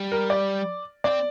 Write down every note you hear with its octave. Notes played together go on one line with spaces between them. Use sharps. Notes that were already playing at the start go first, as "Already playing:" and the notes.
Already playing: G3
A#4
D5
C4 D5